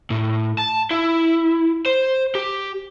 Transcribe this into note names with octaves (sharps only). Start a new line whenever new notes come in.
A2
A5
E4
C5
G4